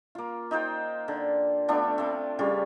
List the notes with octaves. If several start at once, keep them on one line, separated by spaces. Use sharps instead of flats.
A#3 F4
D#4 F4 C5 G5
D3
A3 B3 D4 F4
A3 C4
C#3 G3 F4 C#6